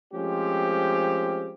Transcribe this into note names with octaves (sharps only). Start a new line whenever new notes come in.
F3 G#3 A3 C4 C#4 G4